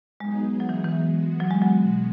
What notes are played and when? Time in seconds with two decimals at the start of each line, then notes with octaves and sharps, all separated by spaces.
0.20 F#3 G#3 B3 D#4 G#4
0.60 F#3
0.69 E3
0.85 E3
1.00 G#3 B3 F#4
1.40 F#3
1.51 G#3
1.62 F#3
1.80 B2 G#3 B3 F#4